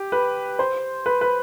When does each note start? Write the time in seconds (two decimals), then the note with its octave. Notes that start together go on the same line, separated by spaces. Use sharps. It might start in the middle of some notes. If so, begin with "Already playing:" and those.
Already playing: G4
0.12 B4
0.59 C5
1.06 B4
1.21 B4